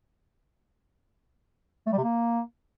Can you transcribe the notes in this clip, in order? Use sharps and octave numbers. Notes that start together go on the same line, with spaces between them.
A3
G3
C3
A#3